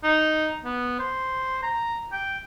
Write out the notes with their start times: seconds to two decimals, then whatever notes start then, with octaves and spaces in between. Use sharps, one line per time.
0.04 D#4
0.64 B3
1.00 C5
1.63 A#5
2.13 G5